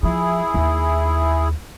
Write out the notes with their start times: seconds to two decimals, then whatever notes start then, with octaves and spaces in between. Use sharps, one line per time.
0.03 F3 E4 G#4
0.54 D#2